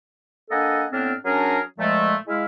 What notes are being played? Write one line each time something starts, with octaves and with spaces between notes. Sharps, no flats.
A#3 D4 A4 D#5 F#5 G#5
A2 B3 C4 D4 F6
F#3 C#4 D4 G#4 A#4
A#2 F3 G#3 A3
G#3 E4 F5